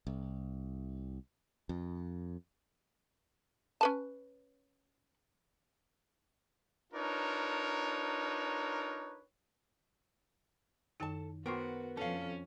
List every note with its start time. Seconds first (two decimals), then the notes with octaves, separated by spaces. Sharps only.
0.07 C2
1.69 F2
3.81 C#4 B4 A5
6.92 D4 D#4 F4 A#4 B4 C#5
11.00 F#2 D#3 D#4 A4 A5
11.46 B3 F#4 A#4 C5 G5 C#6 D6
11.97 F2 C#4 A4 F5